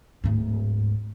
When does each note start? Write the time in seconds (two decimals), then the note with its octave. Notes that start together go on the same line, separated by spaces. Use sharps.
0.24 D1 G#2